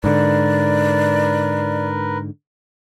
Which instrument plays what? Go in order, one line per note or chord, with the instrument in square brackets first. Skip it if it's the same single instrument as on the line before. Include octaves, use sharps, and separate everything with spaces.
[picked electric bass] G#2 D3 [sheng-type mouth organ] A#4 B4 [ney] D5